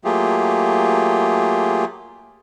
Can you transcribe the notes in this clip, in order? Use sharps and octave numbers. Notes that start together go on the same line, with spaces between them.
F#3 A3 A#3 F4 G4 G#4